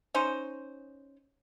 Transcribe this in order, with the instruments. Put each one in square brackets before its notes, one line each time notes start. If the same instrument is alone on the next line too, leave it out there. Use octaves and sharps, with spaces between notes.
[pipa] C#4 D#4 C5